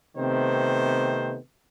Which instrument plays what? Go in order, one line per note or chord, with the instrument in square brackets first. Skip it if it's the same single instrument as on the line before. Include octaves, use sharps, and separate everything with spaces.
[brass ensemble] C3 D#3 A3 B3 C4 C5